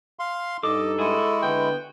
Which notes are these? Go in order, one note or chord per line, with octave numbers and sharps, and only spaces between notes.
F5 C6
G2 D#4 A4 D#5 D6
G#3 E4 F#4 G#5 D#6
D3 B3 G5